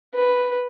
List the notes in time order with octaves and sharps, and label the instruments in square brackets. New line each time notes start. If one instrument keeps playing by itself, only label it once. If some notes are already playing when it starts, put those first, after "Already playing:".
[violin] B4